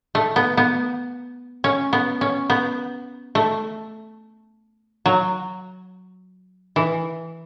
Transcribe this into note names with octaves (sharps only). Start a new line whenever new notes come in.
A3
B3
B3
C#4
B3
C#4
B3
A3
F#3
E3